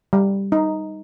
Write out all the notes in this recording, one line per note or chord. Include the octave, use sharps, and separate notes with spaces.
G3
D#4